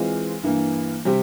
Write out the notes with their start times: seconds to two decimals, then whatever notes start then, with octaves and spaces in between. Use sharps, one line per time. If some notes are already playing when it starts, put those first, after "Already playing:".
Already playing: E3 G#3 C4 F4
0.43 G2 E3 A#3
1.05 C3 G3 C4 G4